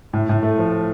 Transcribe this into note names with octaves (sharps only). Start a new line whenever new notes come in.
A2
A2
A3
F3